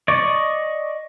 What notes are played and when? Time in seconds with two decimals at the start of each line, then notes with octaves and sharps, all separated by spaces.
0.08 D5 D#5 C#6 D6